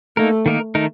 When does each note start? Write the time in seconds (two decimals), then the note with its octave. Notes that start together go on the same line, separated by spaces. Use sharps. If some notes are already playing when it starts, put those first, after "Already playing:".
0.17 A3 A#3 D#4 A#4
0.46 D#3 A#3 D#4 A#4
0.75 D#3 A3 D#4 A#4